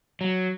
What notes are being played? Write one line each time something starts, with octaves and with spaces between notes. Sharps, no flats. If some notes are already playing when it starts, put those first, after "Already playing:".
F#3